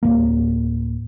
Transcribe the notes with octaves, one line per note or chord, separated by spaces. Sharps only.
D1 F2 A#3